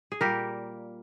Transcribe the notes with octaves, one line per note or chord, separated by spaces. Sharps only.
G#4
A#2 G3 A#3 G4 A#4